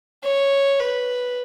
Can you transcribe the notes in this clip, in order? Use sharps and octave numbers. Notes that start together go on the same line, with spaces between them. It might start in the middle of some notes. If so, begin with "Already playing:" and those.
C#5
B4